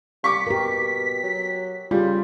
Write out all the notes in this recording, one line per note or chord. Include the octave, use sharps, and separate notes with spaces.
G3 C#6 D6 B6
B2 G4 A#4
F#3
C#3 G3 F4